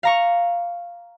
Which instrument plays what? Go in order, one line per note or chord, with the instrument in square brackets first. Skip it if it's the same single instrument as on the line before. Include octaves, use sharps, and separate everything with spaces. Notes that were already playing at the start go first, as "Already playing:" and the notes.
[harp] F5 A#5 C#6